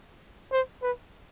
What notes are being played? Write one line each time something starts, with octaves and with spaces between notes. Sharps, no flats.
C5
B4